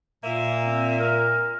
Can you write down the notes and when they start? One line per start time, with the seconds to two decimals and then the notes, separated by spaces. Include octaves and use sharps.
0.24 A#2 A#3 E5
0.64 C4
0.99 A#4